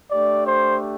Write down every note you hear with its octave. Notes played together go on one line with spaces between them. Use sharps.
A3 D4 G4 D5
C5